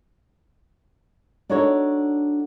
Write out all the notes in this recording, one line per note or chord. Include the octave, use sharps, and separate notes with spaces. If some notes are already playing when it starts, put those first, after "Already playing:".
D4 D#4 F#4 A4 C#5